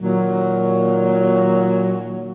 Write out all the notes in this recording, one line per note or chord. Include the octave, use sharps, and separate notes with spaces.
A#2 D#3 F#3